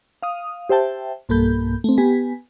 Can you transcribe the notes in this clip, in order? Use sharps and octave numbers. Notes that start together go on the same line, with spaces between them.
F5 D#6
G4 C5 E5 G5 A5
B1 G2 A#3 A4 B5 G6
A3 C4
B3 G4 G#5 B6